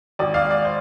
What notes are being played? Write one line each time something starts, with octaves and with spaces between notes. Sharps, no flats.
G#1 D5
D5 F5
G#2
D5
C5